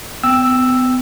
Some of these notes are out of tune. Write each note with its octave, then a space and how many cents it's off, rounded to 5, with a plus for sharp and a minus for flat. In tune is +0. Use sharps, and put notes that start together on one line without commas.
B3 +40 G5 +0 E6 +0